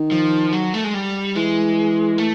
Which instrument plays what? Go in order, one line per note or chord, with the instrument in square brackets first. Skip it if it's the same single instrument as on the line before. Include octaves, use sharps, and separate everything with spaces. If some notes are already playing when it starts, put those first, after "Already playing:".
Already playing: [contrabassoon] D#3
[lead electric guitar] F3
F#3
A3
G#3
G3
[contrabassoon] E3 [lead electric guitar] G#3
[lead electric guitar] A3